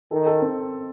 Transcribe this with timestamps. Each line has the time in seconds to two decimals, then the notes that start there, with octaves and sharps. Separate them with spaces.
0.11 D#3 A4
0.26 A4
0.42 C4